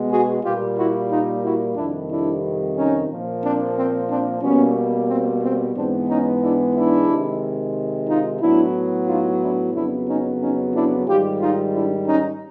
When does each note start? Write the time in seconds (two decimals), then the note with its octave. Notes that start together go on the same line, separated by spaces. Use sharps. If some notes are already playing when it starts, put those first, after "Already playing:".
Already playing: B2 G#3 B3
0.10 F#4 G#4
0.43 A#2 G3 A#3 F4 G4
0.76 E4 F#4
1.09 D#4 F4
1.43 E4 F#4
1.76 F2 C3 D#3 G3 D4 E4
2.09 D4 E4
2.76 C#4 D#4
3.09 A#2 F3 A#3
3.42 C4 D4
3.76 C4
4.08 C4 D4
4.42 B2 G3 A#3 B3 C#4
5.08 C4
5.42 C4
5.75 G#2 E3 G#3 B3 C4 D4
6.08 C#4 D#4
6.41 D4 E4
6.75 D4 E4
7.08 C3 D#3 G#3
8.08 D#4 F4
8.41 A2 F#3 B3 D4 E4
9.07 D#4 F4
9.41 D4 E4
9.74 F2 C#3 F#3 B3 D4 E4
10.07 C#4 D#4
10.40 C#4 D#4
10.73 D4 E4
11.06 G#2 D#3 G3 F4 G4
11.40 D#4 F4
11.73 D4 E4
12.06 C#4 D#4